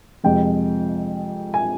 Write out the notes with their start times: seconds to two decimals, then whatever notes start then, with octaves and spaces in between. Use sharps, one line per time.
0.24 F2 C3 F3 G#3 G5
1.54 G#5